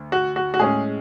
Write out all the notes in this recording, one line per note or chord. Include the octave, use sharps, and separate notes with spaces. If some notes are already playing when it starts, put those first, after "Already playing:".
Already playing: D2
F#4
F#4
F#4
A2 G#3 C#4 G#4